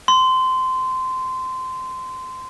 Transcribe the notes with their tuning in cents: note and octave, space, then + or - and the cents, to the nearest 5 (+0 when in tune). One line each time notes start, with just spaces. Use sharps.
C6 -20